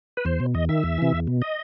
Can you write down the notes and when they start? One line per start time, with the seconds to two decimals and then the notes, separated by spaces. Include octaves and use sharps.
0.17 B4
0.25 E2 C5
0.40 B2
0.54 E2 D#5
0.69 D#3 E5
0.83 E2
0.98 C3 E3
1.12 E2
1.27 B2
1.42 D#5